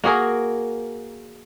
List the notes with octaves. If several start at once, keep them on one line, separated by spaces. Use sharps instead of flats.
A#3 F#4 G#4 A#4